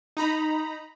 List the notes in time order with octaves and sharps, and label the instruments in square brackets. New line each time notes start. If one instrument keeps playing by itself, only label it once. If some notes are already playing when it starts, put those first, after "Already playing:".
[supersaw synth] D#4 A#5 B5